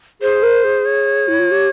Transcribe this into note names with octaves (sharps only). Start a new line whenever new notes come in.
G#4 C5
A#4
G#4
C#5
E4
F4
G4